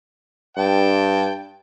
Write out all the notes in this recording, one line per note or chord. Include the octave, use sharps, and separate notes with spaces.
G2 G5 A5